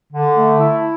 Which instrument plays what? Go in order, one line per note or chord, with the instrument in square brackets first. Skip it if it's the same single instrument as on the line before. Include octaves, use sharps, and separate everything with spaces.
[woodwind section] D3
A3
E4